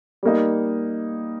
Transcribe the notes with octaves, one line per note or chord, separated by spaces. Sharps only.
G3 A#3 D#4